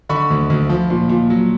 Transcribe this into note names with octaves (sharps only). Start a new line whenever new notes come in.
D3 B5 C#6
D2
D2
F3
A#2
A#2
F#3